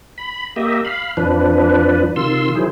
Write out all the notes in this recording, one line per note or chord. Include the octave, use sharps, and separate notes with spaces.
B5
A#3 G4 D#5 E5
F5 B5
F2 F3 D4 B4
C3 D#3 F4 C6 E6
D#3 F#3 E4 G#4 C5